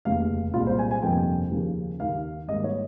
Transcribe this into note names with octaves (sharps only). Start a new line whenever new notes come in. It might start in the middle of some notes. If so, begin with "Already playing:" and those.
F1 D#2 C#3 F5
C2 A#2 G#3 F4
C5
G#5
G#5
G1 F2 C3 F3 A#3 G5
D#2 C#3 F3 A#3
D#2 D#3 A#3 F5
G#1 G#2 D#3 G3 A#3 D#5
C#5